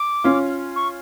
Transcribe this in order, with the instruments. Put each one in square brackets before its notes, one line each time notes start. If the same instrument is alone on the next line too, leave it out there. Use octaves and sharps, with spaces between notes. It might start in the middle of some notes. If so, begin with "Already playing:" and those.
Already playing: [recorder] D6
[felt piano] C#4 F4
[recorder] C#6